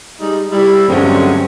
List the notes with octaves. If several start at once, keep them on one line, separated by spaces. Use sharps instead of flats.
G3 G#3 D#4
G3 E4
G2 D3 F#3 G#3 A3 C4 C#4